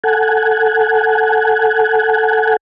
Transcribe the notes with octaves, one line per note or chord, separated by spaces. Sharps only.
A4 F#5 G#5